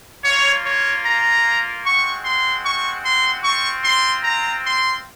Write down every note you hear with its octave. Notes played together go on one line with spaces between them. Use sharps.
A#3 F4 C#5
C#5
A#5
G#3 C4 F#4 C#6
C6
C#6
C6
C4 F4 C#6
C6
A#5
C6